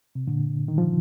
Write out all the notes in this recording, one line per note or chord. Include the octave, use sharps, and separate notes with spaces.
C3
A#2 D3
D#3
F3